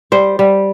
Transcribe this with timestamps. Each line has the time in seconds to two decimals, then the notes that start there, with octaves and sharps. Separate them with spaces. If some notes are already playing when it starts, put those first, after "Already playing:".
0.12 G3 C5
0.39 G3